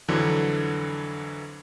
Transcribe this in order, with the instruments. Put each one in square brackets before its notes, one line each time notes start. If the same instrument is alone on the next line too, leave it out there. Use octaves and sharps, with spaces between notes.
[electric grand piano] F2 D3 E3 F#3